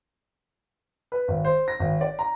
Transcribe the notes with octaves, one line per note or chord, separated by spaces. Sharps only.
B4
G#1
C5
A#6
G#1
D5
A#5